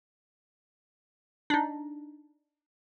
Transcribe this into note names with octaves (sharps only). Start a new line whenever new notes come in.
D4 D#4